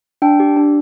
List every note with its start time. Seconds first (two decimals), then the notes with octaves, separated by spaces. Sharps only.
0.22 D4 G5
0.40 G4
0.57 D4